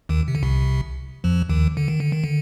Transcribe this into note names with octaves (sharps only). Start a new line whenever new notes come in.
D#2 D#3
C3
D3
C2 C3
F2 F3
D#2 D#3
D3
D#3
D3
D#3
D3